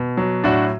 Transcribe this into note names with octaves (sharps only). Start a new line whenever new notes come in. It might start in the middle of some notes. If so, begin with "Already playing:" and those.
Already playing: B2
F#3
A2 D4 F#4